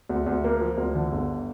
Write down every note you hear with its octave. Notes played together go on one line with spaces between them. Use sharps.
D2
D2
A#3
F3
D2
D3
G1